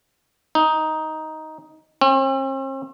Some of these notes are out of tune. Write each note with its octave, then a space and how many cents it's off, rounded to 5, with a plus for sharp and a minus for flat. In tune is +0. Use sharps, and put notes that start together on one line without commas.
D#4 +10
C4 +45